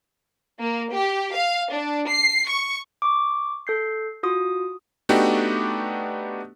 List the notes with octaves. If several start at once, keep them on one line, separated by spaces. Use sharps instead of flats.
A#3
G4
F5
D4
C7
C#6
C#6 D6
A4 G6 C7
F4 F#4 D#6
A3 B3 D4 D#4 F#4 G4